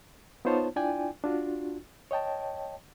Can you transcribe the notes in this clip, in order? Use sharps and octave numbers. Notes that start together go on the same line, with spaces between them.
B3 D#4 F4 C5 C#5 A5
D4 E4 F4 D5 G5 G#5
D4 F4 F#4
C#5 D#5 G5 A5